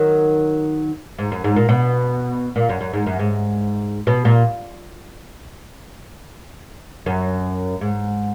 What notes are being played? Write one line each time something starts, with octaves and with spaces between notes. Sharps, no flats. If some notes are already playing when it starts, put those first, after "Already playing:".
Already playing: D#3 F#3
G#2
F#2
G#2
A#2
B2
A#2
F#2
F#2
G#2
F#2
G#2
B2
A#2
F#2
G#2